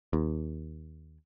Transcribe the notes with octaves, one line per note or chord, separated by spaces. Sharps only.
D#2